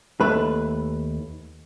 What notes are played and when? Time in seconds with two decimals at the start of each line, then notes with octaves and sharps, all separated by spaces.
0.20 D#2 A3 B4